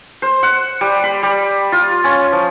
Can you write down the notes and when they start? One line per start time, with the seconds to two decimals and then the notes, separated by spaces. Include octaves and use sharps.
0.22 C5
0.43 F#5
0.81 G3
1.04 B5
1.23 G3
1.72 F4
2.04 C#4
2.32 F3